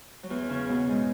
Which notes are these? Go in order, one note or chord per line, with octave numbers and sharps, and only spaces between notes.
F#3
E2 E3
C#3 C#4
B2 B3
G#2 G#3